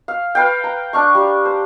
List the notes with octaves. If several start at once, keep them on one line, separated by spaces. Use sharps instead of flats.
F5
B4 F5 G5
A#5
D4 F5 C#6
G3
C5